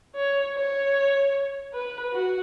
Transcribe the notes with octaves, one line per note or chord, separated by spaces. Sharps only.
C#5
C#5
B4
F#4